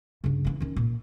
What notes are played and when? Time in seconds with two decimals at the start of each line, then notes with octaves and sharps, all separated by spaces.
0.24 G2 C#3
0.44 E3 C#4
0.60 D#3 C#4
0.76 A#2